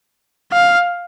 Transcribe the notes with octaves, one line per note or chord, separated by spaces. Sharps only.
F5